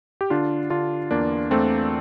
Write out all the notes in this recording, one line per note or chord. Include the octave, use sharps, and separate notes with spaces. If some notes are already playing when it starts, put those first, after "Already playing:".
G4
D3 D4 F4
D3 D4 F4
E2 A#3 D4
E2 A3 C4